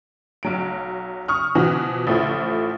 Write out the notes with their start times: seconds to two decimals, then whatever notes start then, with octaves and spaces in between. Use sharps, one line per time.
0.43 B1 F#3 D7
1.28 C#6 D#6 F6
1.55 B2 E3 F3 F#4
2.07 A1 F3 A3 E4